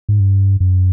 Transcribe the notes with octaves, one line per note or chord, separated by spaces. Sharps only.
G#2
G2
F#2